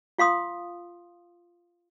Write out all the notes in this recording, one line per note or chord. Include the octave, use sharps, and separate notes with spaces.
F4 F5 C6 D#6